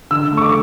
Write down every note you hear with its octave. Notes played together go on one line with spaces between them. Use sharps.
D3 E6
A3
C#6
D6